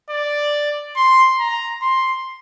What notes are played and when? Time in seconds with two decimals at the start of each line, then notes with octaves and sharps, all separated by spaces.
0.10 D5
0.96 C6
1.39 A#5
1.82 C6